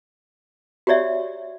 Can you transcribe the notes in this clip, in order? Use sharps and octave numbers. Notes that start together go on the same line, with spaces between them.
F#4 G4 C#5 D5 E5